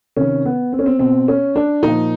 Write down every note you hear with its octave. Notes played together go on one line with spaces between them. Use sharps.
C3 D#3 C#4
B3
C4
C#4
C4
B2 C4
C#4
D4
A#2 D#4
F3